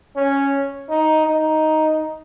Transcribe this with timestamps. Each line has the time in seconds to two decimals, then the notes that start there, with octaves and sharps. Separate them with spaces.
0.16 C#4
0.90 D#4
1.27 D#4